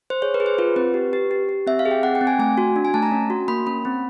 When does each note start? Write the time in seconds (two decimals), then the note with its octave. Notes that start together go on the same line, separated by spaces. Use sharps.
0.10 C5
0.22 G#4 C#5
0.34 B4
0.40 G#4
0.46 C5
0.58 F4 B4
0.76 C4 B4
0.94 G4
1.13 G4
1.31 G4
1.49 G4
1.67 C4 E5
1.79 F5
1.85 G#4
1.91 G5
2.03 C4 F#5
2.15 G5
2.21 C4
2.27 G#5
2.39 A3 G#5
2.58 F#4
2.76 D4
2.85 G#5
2.94 A3 A5
3.03 A#5
3.12 C#4
3.30 F#4
3.48 A#3 B5
3.66 C#4 B5
3.85 C4